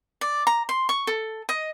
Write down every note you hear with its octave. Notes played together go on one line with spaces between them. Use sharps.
D5
A#5
C6
C#6
A4
D#5